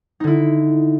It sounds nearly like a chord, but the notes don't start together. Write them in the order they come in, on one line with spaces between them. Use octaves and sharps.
D#4 D3 E4